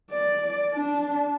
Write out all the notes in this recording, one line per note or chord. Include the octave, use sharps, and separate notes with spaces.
D5
D4